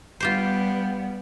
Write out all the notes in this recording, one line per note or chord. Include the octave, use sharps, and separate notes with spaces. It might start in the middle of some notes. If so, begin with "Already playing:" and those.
G3 B3 F4 G4 C5